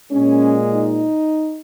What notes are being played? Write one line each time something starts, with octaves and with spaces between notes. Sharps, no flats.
A#2 G#3 C#4
D#4